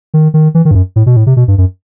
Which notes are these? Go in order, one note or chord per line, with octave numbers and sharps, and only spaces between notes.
D#3
D#3
E3
D#3
G2
F#2
A2
B2
A2
C3
B2
G2
F#2